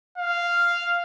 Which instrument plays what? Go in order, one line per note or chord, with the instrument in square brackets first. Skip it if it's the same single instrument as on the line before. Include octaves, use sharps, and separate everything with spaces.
[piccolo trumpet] F5